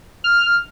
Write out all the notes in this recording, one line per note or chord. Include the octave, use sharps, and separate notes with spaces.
F6